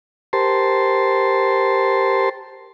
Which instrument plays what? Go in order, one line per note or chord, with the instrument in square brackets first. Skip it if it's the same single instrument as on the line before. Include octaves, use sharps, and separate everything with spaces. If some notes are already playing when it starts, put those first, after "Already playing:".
[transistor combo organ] G4 A#4 C5 A5 C6